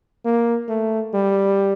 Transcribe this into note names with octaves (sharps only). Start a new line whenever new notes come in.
A#3
A3
G3